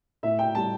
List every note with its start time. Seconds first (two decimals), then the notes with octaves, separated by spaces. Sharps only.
0.23 A2 E5
0.39 G5
0.55 G3 A5